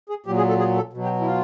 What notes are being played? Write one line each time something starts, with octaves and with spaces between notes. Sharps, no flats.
G#4
A#2 F#3 G4
G#4
A4
G#4
A4
B2 F#3
G4
E4
F4